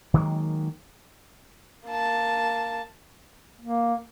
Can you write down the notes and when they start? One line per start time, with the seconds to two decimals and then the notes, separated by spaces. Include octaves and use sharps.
0.14 D#3 F#3 G#3 A#3
1.87 A#3 A5
3.61 A#3